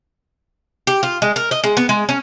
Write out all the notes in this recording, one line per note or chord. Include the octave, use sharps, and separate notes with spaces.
G4
F4
G#3
A#4
D#5
G#3
B3
G#3
C#4